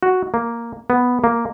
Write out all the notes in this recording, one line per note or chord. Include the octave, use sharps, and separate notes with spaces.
F#4
A#3
B3
A#3